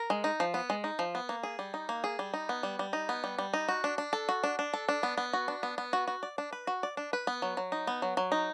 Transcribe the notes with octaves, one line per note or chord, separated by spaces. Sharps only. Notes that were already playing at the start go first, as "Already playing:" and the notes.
Already playing: A#4
G#3
D#4
F3
B3
G#3
D#4
F3
B3
A#3
G#4
G3
D#4
A#3
G#4
G3
D#4
B3
G3
G3
D#4
B3
G3
G3
D#4
F#4
D4
D4
A4
F#4
D4
D4
A4
D4
B3
B3
F#4
D4
B3
B3
F#4
F#4
D5
D4
B4
F#4
D5
D4
B4
B3
F#3
F#3
D#4
B3
F#3
F#3
D#4